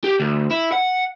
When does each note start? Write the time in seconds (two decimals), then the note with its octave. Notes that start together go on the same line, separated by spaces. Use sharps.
0.04 G4
0.20 D2
0.51 E4
0.72 F#5